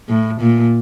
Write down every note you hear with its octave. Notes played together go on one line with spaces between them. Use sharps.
A2
A#2